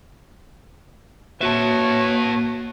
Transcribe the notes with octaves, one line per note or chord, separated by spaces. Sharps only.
A#3 F#4 B4 C#5 E5 A5